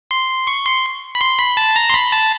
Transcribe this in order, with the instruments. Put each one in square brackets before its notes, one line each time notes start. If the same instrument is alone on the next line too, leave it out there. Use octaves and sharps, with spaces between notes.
[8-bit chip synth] C6
C#6
C6
B5
C6
B5
A5
A#5
C6
B5
A5